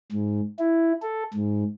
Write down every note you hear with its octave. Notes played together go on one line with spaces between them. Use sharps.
G#2
E4
A4
G#2